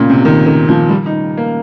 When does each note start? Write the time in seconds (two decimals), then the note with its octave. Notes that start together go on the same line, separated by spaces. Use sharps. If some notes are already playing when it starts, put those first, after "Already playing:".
Already playing: A#2 C#3
0.10 C3
0.25 D#3
0.46 D#3
0.69 F3
0.89 G3
1.06 D#4
1.37 A#3